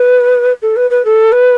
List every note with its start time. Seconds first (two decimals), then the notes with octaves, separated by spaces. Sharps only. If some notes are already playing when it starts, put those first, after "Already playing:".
Already playing: B4
0.62 A4
0.76 B4
0.90 B4
1.05 A4
1.32 B4